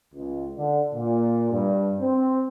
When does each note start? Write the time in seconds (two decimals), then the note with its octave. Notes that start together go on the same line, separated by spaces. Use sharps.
0.13 C#2
0.56 D3
0.93 A#2
1.51 G2
2.00 C4